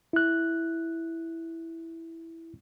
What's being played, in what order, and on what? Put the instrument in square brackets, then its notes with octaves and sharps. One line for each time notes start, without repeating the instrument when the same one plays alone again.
[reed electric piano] E4 F#6